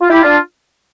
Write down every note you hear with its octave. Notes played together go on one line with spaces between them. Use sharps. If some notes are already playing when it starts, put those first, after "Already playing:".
F4
E4 G4
D4 F4